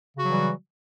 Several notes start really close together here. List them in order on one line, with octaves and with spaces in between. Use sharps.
C#3 F#4 F#3 E3 G3